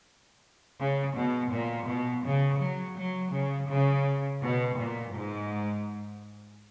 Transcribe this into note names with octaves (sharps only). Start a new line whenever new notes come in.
C#3
B2
A#2
B2
C#3
F#3
F#3
C#3
C#3
B2
A#2
G#2